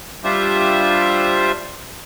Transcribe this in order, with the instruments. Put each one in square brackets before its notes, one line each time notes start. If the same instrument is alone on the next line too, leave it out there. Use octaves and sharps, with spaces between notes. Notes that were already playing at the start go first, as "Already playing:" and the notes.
[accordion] G3 D4 F4 G4 C5 E5